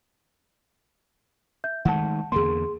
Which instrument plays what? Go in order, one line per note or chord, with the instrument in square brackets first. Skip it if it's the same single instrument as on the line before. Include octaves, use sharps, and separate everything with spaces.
[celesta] E5 G6
[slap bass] D#3 G#3 A3 [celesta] F#5 A5
[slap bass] E2 D3 A#3 [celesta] G#4 C6